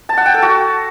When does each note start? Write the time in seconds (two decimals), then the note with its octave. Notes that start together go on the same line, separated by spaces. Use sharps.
0.09 A5
0.17 F#5
0.26 G5
0.34 A4
0.42 F#4